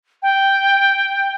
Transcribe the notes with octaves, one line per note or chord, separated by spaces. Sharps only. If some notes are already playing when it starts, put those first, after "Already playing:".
G5